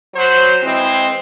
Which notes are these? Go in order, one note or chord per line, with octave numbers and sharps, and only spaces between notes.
F#3 C5
E3 G#3 C4